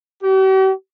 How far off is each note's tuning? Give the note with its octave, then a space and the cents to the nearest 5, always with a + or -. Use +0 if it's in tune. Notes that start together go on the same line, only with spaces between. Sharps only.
G4 -45